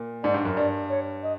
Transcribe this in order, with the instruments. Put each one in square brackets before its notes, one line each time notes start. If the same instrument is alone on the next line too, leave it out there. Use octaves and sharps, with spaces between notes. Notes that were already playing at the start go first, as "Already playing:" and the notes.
Already playing: [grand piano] A#2
[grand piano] G#2 [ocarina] D5
[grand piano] G2
F#2
[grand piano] G2 [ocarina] D5
[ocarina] C#5
D#5